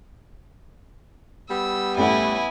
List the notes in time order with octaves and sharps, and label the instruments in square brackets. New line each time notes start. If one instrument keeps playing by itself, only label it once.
[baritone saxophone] G3 [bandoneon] B3 [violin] E6
[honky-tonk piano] A1 A2 F#5 [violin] E4 G#5